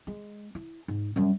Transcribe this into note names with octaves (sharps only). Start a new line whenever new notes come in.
G#3
E4
G#2
F#2 G3